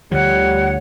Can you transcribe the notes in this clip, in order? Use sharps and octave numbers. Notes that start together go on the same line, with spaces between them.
D2 D3 F3 G3 C#5 F#5